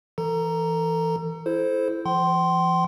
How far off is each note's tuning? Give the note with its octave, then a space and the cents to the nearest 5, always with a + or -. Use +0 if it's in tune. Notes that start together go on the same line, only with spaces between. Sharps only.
E3 +0 A4 +35 A#5 +0
E4 +10 A4 -20 C5 +0
F3 -40 G5 -40 C6 +0